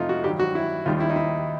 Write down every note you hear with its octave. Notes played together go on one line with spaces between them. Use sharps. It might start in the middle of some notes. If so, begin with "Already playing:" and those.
Already playing: F2 C3 E3 A3 D#4 F4
F#4
G2 D#3 F#3 G4
F#4
E4
D#2 D#3 G3 F4
E4
D#4
E4